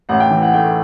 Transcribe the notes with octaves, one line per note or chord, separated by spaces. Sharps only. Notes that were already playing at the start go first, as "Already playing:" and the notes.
A1 F#5
G5
E3
F#5
A3 G5